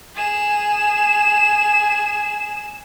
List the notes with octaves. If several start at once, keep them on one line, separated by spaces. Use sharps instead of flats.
G#4 E7